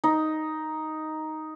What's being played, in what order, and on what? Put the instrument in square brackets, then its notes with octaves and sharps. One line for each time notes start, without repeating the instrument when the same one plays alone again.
[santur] D#4